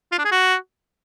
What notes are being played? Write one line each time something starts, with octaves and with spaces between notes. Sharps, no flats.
F4
D4
G#4
F#4